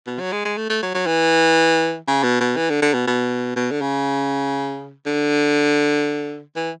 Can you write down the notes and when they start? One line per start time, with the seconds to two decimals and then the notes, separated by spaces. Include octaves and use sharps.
0.07 B2
0.20 F#3
0.32 G#3
0.45 G#3
0.57 A3
0.70 A3
0.83 F#3
0.94 F#3
1.06 E3
2.07 C#3
2.23 B2
2.41 B2
2.56 E3
2.70 D3
2.82 D3
2.94 B2
3.07 B2
3.56 B2
3.71 D3
3.81 C#3
5.06 D3
6.56 E3